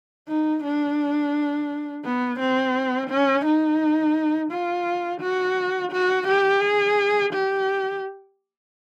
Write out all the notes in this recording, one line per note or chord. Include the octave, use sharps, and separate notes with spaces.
D#4
D4
B3
C4
C#4
D#4
F4
F#4
F#4
G4
G#4
G4